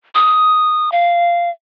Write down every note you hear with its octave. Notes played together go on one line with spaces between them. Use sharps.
D#6
F5